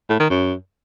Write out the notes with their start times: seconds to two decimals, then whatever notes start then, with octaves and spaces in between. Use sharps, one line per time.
0.09 A2
0.20 D#3
0.30 F#2